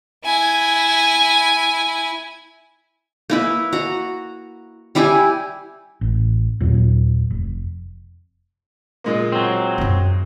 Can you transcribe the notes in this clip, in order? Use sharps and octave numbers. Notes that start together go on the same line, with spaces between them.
E4 G#5
A#3 E4 B4
F#4 A#5
G3 E4 G4 G#5
A1
D#2 A#2 F#3
F1
A#2 G#3 A#3
F#3 C4
F#2 C#4